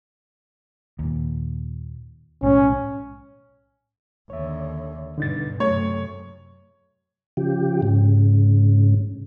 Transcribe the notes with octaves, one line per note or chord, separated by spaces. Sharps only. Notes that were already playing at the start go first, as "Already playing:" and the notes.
D#2 A#2
B1 A2 G#3 C#4
D#2 D3 C#5 E5
G2 B2 D3 D#4 A6
F#2 C3 A3 C#5
C#3 F3 G4
G#2 C#3